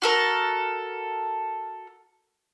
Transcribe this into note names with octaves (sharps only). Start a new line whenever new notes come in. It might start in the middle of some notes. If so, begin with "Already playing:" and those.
F#4 A4 A#4